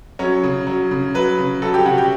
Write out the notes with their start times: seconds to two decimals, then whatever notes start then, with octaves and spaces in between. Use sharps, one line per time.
0.19 F#3 C#4
0.43 C#3
0.67 F#3
0.91 C#3
1.14 F#3 B4
1.38 C#3
1.62 F#3 A4
1.74 G4
1.86 C#3 F#4
1.98 G4